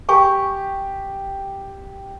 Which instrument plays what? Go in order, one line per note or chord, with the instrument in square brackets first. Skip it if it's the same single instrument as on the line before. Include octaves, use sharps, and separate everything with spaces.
[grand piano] G4 [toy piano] G#5 C#6